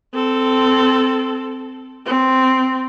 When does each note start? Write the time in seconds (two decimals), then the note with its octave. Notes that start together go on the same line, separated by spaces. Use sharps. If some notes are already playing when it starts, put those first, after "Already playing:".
0.14 C4 A4
2.06 C4